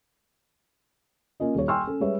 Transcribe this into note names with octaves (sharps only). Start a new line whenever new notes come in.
A#3 C#4 F4 D#5
D#1 C#5
G5 G#5 C6 C#6 E6 F6
C#4 A4
G3 G#3 B4 C#5 E5